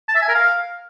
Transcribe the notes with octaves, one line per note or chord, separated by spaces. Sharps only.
A5
E5
G#5
A#4
F5